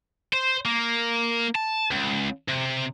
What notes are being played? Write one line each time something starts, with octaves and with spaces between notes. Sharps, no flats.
C5
A#3
A5
C#2
C3